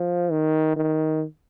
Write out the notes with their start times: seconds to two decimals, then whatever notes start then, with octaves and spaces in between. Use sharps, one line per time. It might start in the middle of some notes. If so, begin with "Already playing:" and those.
Already playing: F3
0.31 D#3
0.76 D#3